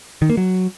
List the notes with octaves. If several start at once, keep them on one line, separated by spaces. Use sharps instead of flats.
D#3
A#3
F#3